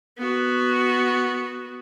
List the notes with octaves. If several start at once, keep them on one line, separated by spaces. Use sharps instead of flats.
B3 F#4